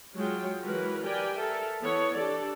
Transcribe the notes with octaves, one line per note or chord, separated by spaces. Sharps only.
F#3 G#3 F4 G5
E3 F#3 G#3 F#4 A#4 B4
G4 A#4 B4 D5 G5 G#5
A4 A#4 E5
E3 B3 A4 C#5
D4 G4 A4 D5